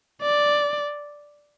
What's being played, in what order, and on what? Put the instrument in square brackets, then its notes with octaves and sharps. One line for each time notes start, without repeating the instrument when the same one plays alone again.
[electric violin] D5